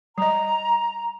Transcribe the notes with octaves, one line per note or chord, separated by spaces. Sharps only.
G3 D#5 A#5